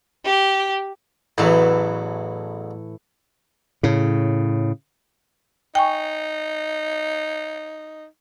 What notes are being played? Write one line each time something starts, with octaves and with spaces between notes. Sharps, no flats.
G4
A1 E2 A2 E3 F#3
A2 C#3
D#4 G5 G#5 C#6